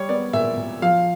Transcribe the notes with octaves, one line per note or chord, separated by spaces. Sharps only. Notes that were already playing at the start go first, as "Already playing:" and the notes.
Already playing: G3 C#5
B3 D5
A#2 E5
A#2
F3 F5